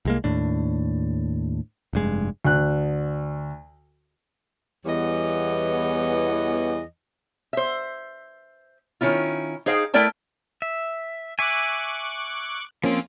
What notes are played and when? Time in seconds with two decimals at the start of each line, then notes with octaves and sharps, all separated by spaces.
0.05 C2 G#3 A#3
0.24 D#2 A2 D4
1.93 F1 G2 G#3
2.45 D2 F#6
4.85 E2 E3 G3 B3 C#5 D#5
7.53 C5 E5
9.01 D#3 C#4 E4 F4
9.66 D#4 G#4 C5 F5 G5
9.94 A3 E4 A#4 D5 G5 A5
10.62 E5
11.39 E5 G#5 C#6 D6 F#6
12.83 F3 A#3 C4 C#4 F4